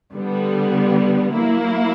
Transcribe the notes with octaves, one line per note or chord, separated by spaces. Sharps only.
D3 G3 B3
F#3 A#3 E4